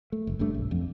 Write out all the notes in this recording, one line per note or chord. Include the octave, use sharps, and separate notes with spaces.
A3
F1
G1 G2 A3 D4
B1
F2